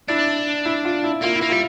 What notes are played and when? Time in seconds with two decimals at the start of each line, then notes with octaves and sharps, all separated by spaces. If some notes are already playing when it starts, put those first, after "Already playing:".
0.09 D4 E4
0.65 E4
0.85 F4
1.04 E4
1.22 A#3 F4
1.36 E4
1.42 A#3
1.50 G3 F4